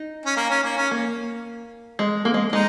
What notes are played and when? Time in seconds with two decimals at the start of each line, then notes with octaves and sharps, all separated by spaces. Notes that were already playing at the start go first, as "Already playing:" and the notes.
Already playing: D#4
0.25 C#4
0.36 A#3
0.50 C#4
0.64 A#3
0.77 C#4
0.91 A#3
1.99 G#3
2.25 A#3
2.34 G#3
2.52 G#3 D#4